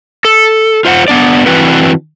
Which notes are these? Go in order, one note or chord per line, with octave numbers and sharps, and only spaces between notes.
A4
F4 C5 F5 F#5
B3 D4 D5
E3 C4 D4 E4 F#4 B4